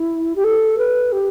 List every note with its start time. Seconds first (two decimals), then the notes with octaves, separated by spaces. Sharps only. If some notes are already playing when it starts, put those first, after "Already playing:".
Already playing: E4
0.36 G4
0.44 A4
0.78 B4
1.12 G4